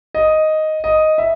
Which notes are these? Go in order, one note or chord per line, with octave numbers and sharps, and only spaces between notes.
D#5
D#5
E5